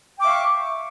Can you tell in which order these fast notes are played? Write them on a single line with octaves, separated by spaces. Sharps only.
G5 D6 E5 F5 C#6